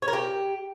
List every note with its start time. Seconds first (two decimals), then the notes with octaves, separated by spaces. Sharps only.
0.02 C#5
0.08 A#4
0.13 G4